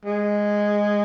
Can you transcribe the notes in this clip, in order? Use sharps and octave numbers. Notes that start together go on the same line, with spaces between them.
G#3